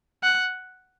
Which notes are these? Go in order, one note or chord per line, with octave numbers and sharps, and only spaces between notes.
F#5